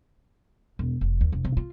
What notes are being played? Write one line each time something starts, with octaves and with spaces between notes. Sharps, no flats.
E1
F1
D#2
F1
C3
F4